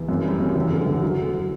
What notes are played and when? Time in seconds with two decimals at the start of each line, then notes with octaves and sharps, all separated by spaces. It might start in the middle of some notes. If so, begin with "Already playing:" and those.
Already playing: E2
0.09 F#2
0.25 G3
0.40 F#2
0.56 E2
0.71 D3
0.86 E2
1.02 F#3
1.18 F#3
1.34 F#3